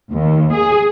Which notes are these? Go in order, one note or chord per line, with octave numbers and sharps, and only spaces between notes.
D#2
G#4